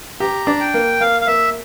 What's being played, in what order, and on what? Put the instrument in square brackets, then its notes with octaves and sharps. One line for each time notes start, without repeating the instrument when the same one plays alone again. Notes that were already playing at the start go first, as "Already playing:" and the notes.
[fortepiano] G4 [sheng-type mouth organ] A#5
[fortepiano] D4
[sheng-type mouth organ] G5
[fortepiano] A#3
[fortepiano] A#3 [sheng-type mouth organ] F5
[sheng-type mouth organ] F5
[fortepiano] A#3 [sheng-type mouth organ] E5